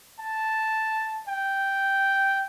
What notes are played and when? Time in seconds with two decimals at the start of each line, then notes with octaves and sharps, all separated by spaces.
0.20 A5
1.29 G5